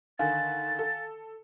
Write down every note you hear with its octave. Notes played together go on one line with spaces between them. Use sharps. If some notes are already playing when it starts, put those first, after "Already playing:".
D3 D#3 F5 G#5 A6
A4